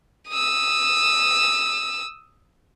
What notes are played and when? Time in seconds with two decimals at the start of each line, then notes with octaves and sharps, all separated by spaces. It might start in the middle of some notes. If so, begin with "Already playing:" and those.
0.29 D#6 E6